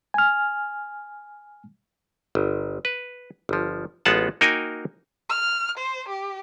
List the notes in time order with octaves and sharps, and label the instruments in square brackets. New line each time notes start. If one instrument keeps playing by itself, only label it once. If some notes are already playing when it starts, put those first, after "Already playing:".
[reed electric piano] G#5 F6
[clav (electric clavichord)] G1
B4
G1 F3
A1 G#3 B3 F4 F#5 A5
A#3 D#4 F#4 A#4 G5 G#5
[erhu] F6
C5
G4